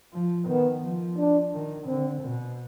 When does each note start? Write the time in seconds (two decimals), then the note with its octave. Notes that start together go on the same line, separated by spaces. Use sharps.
0.13 F3
0.48 D#3 B3
0.82 F3
1.17 D4
1.52 D#3
1.87 D3 C4
2.22 B2